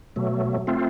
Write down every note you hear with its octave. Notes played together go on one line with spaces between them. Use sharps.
B2 F#3 A3
A3 C4 F4